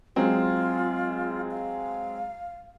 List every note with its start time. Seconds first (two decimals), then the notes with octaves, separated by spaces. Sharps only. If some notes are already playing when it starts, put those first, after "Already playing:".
0.16 F#3 G#3 C4 F4
1.51 F5